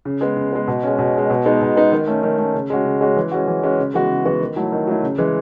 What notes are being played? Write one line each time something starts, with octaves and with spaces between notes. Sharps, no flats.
C#3
G#3 B3
C#3
G#3 B3
B2
G#3 C#4
B2
G#3 C#4
B2
G#3 B3 D#4
B2
G#3 B3 D#4
D#3
A3 C#4
D#3
A3 C#4
C#3
G#3 C#4 F#4
C#3
G#3 C#4 F#4
E3
G#3 C#4 F#4
E3
G#3 C#4 F#4
C#3
E3 G#3 B3 F#4
C#3
E3 G#3 B3 F#4
D#3
F#3 A3 E4
D#3
F#3 A3 E4
C#3
E3 G#3